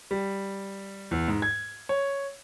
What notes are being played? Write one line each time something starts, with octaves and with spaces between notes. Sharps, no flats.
G3
E2
G#2
G#6
C#5